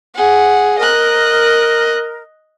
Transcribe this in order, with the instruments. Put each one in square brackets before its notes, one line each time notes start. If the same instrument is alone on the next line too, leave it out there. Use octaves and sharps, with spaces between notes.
[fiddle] G#4 F#5
[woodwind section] A#4 [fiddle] D#5 F#6